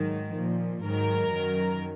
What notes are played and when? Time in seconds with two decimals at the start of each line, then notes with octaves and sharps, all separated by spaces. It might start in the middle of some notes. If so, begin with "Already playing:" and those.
Already playing: G#2 D#3 F#3
0.35 A#2 F3
0.84 G#2 D#3 F#3 A#4
1.32 F#2 D#3 F#3